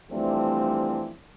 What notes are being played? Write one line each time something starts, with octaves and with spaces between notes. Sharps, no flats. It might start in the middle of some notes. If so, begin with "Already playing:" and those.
E3 F3 G3 A3 C4 D4